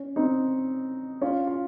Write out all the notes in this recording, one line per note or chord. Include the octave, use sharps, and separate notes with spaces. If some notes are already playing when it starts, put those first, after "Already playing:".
Already playing: C#4
C4 D#4
C#4 F4
F4